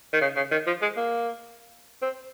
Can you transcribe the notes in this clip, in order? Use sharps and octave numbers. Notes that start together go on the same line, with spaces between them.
D#3
C#3
C#3
D#3
F3
G#3
A#3
C4